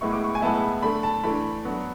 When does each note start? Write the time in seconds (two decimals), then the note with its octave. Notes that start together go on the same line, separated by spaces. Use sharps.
0.01 A2 G#3 B3 E4 C#6
0.12 D6
0.24 C#6
0.35 G#5
0.42 A2 G#3 B3 E4 A5
0.82 D3 A3 D4 B5
1.03 A5
1.23 E3 A3 D4 B5
1.65 F#3 B3 D4